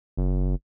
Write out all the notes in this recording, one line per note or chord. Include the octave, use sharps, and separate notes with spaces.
F#1